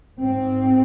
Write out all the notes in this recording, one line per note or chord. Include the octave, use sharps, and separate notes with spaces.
G#2 C4